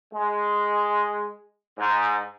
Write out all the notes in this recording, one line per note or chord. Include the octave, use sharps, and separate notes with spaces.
G#3
G#2